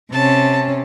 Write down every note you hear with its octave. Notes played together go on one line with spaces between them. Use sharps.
C3 C#4 A5